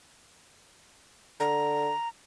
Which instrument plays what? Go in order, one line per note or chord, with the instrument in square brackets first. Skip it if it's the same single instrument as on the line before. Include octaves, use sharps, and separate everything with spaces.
[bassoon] D3 [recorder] A#5